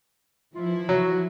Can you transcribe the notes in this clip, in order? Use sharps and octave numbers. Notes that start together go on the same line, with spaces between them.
E3 F3 E4 F4
F#3 F#4